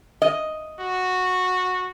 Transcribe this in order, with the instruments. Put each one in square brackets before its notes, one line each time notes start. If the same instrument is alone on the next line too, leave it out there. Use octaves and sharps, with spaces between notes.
[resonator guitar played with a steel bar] D#5
[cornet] F#4